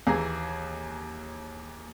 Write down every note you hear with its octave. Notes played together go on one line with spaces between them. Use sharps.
D#2 E3 G#4 A#5